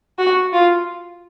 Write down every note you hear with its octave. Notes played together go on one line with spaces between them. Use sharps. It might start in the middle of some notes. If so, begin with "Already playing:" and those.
F#4
F4